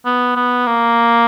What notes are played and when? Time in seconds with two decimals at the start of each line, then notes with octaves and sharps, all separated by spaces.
0.06 B3
0.36 B3
0.67 A#3